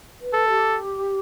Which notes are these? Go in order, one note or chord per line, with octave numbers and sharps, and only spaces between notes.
B4
A4
G4